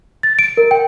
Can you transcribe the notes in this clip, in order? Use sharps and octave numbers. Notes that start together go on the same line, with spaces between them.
A6
D7
A#4
G5